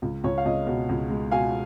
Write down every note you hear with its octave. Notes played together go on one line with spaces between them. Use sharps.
C#2
C#2 C#5
F5
C#2 D#5
B2
C#2
G#3
B2 F5 G#5